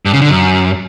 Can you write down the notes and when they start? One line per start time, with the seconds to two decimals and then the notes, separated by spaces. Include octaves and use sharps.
0.05 G2
0.13 C#3
0.21 D3
0.30 F#2